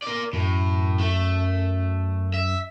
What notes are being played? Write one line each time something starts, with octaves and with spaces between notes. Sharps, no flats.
A#4 D5
F#2 A2
A3
E5